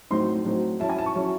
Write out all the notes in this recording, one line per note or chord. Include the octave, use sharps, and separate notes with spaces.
A2 F#3 C4 D#4 C6
A2 F#3 C4 D#4
F#3 C#4 E4 A5
G#5
A5
C#6
F#3 C#4 E4